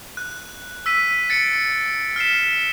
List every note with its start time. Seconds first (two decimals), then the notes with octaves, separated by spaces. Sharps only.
0.17 F#6
0.86 E6 B6 D#7
1.30 A6 C#7 D7
2.16 F6 B6 C7 E7